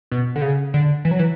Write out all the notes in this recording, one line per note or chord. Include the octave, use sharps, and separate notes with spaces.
B2
D3
C#3
D3
E3
F#3
E3